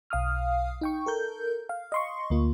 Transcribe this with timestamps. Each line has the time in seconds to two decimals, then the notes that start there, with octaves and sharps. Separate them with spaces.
0.10 B1 F5 D#6 F6
0.81 D#4 G5 C#6
1.06 A4 A#4 G6
1.69 F5
1.92 D#5 C6 C#6
2.30 D2 A#3 F4